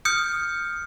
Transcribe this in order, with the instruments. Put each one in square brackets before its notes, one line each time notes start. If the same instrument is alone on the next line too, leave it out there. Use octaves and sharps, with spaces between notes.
[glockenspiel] D#6 F6 G6 C#7